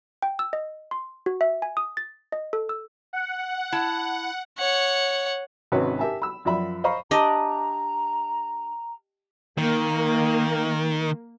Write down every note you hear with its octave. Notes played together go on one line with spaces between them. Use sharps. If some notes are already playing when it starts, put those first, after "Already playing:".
G5
E6
D#5
C6
F#4
E5
G#5
D#6
A6
D#5
A4
E6
F#5
E4 A5
C#5 F#5
G#1 C3 C#4 F#4 B4
G4 A#4 E5 G#5 A5
B5 E6
F#2 F3 D5 E5 B5
C5 D#5 F5 A#5 B5 C#6
D4 G4 D#5 A#5
D#3 A#3